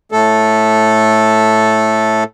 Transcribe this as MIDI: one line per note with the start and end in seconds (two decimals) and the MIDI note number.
0.12 2.24 45
0.12 2.24 57
0.12 2.24 69